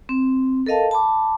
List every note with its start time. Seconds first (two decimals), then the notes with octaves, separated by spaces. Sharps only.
0.09 C4
0.66 A4 A#4 D#5 F5 A5
0.91 A5 B5 D6